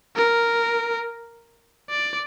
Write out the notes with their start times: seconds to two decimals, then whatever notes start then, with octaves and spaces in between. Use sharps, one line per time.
0.16 A#4
1.89 D5